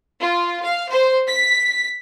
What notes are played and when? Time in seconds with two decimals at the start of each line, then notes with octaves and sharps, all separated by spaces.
0.21 F4
0.63 F5
0.92 C5
1.28 B6